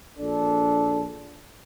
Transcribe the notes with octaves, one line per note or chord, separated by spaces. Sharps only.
A#1 D4 A4